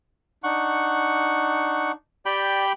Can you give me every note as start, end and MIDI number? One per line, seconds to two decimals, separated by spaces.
0.44 1.91 62
0.44 1.91 63
0.44 1.92 78
0.44 1.92 85
2.26 2.72 67
2.26 2.64 74
2.26 2.72 79
2.26 2.72 83